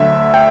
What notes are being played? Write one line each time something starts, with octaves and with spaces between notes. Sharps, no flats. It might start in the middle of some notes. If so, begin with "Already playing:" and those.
Already playing: D2 D3 F#3 E5
G5